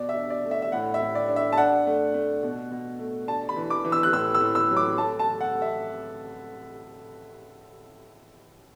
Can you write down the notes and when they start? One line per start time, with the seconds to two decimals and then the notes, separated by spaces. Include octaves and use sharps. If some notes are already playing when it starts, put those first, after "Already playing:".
Already playing: B2 D5
0.09 E5
0.16 D4
0.30 D5
0.45 A3
0.51 E5
0.62 E5
0.72 A2 F#5
0.94 E5
1.02 A2
1.15 D5
1.29 D4
1.36 E5
1.53 A5
1.57 D4 F#5
1.87 A3
2.14 A3
2.43 B2
2.71 B2
2.99 A3
3.27 D4 A5
3.49 B5
3.56 E3
3.70 D6
3.85 E3
3.92 E6
4.03 F#6
4.13 A2 E6
4.34 E6
4.41 A2
4.55 E6
4.70 F#3
4.77 D6
4.98 A3 A5
5.19 A5
5.27 A3
5.41 F#5
5.54 A3
5.62 E5